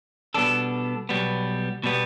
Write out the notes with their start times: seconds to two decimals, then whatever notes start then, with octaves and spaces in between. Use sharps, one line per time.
0.34 B2 G3 B3 D4 A4
1.09 B1 B2 G3 B3
1.84 B2 G3 B3